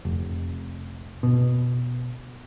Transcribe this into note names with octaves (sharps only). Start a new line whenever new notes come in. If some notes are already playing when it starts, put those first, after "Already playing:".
F1
B2